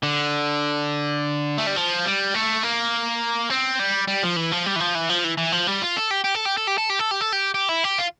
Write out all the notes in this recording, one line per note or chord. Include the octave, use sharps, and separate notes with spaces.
D3
A3
G3
F3
G3
A3
A#3
C4
G3
G3
F3
E3
F3
G3
E3
F3
E3
F3
E3
E3
F3
G3
F4
A4
G4
G4
A4
G4
A4
G4
A4
G4
A4
G4
A4
G4
G4
E4
G4
F4